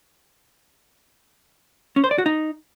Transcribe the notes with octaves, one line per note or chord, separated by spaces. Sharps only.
C#4
C5
D5
F#4
D#4